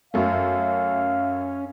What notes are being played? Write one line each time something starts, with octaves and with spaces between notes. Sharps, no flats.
F#2 A3 C#4 F5